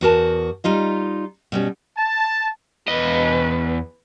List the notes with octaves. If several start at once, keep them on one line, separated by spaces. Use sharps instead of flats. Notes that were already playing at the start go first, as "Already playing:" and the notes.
E2 F#4 A#4 A5
G3 D#4 F4 D#5
B2 G3 C#4
A5
E2 B4 D#5